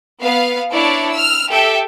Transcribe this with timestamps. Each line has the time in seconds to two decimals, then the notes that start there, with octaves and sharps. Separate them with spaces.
0.22 B3 F5
0.72 D4 E4 C#5 D5
1.11 E6 F6
1.50 G4 A4 E5 G5